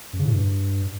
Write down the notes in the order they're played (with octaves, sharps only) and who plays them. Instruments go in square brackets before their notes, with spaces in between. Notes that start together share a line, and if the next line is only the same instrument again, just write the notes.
[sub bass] F#2
C#3
A2
G2